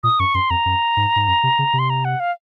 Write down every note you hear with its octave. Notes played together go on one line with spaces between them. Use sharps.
A#2 D#6
F#2 C#6
F#2 C6
F2 A#5
F#2
G#2
G#2
F#2
C3
C#3
C3
C6
A#5
F#5
F5